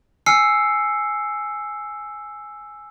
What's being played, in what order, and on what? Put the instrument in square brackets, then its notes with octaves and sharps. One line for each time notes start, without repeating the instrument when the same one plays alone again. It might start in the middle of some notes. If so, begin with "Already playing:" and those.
[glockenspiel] G#5 E6 F6 C7 C#7